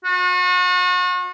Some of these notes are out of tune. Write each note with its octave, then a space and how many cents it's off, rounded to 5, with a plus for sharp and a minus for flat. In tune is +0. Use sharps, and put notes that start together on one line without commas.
F#4 -40